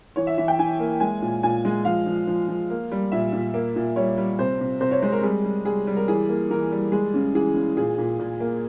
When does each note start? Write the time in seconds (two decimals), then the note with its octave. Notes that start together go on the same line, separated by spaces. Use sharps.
0.16 E3 C#5
0.27 E5
0.38 E3 E5
0.48 G5
0.59 E3 G#5
0.79 A#3
1.00 G#3 G#5
1.22 A#2
1.43 A#2 G#5
1.65 G#3
1.85 F3 F5
2.06 F3
2.27 F3
2.48 F3
2.70 A#3
2.92 G3
3.12 A#2 E5
3.33 A#2
3.54 A#3
3.76 A#2
3.96 G3 C#5
4.18 G3
4.39 C3 C5
4.61 C3
4.81 C3 C5
4.91 C#5
5.02 G#3 C5
5.12 A#4
5.23 G3 G#4
5.44 G3
5.65 G3 G#4
5.87 G3
5.96 A#4
6.08 E3 G#4
6.29 A#3
6.50 E3 A#4
6.72 G3
6.92 G#3 G#4
7.14 C#3
7.34 E3 G#4
7.55 C#3
7.77 A#2 G#4
7.98 A#2
8.19 A#2
8.40 A#3